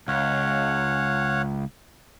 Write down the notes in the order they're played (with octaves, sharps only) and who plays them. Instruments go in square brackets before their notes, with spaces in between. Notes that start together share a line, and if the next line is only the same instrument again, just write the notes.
[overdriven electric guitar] C#2 [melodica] C#5 F5 F#5